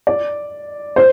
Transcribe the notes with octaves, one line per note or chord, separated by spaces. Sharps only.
D5
C5